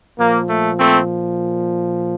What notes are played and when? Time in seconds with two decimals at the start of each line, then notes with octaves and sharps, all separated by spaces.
0.18 A#2 F3 A#3
0.48 A3
0.79 A3 C4